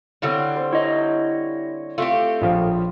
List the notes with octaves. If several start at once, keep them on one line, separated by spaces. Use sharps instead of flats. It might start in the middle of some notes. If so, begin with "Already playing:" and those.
D3 G3 C4 E4 C#5 E6
C5
E4 C#5 D#5
A3 C4 F4 G4
A#1 F3 F5 B5